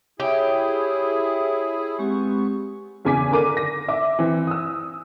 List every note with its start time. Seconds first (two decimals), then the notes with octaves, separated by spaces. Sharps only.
0.20 E4 G4 G#4 C#5 E5
1.99 G#3 B3 C4 G4 C#6
3.05 E2 C#3 G#5 D6 B6
3.31 D3 A#4 D6 D#7
3.57 A#6
3.88 E5 D6
4.19 E3 C4
4.47 D#6 E6